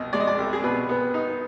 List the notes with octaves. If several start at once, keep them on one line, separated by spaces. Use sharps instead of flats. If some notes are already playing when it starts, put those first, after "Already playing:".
Already playing: C2 B2 D#5
G#3 D5
D#5
D5
C2
G#4
B2 B4
B3
D#4